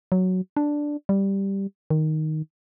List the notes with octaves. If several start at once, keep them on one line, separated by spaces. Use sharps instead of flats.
F#3
D4
G3
D#3